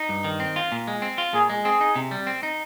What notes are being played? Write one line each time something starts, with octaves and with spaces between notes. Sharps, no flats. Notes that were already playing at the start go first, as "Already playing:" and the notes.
Already playing: D#4
G2
D#3
C4
F4
A#2
G#3
C4
F4
A#2 G#4
G#3
C4 G#4
D#4
C3
G3
C4
D#4